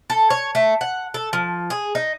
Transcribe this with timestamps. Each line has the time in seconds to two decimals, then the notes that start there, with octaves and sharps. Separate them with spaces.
0.10 A4
0.30 C#5
0.55 A3
0.81 F#5
1.14 A4
1.33 F3
1.70 G#4
1.95 D#4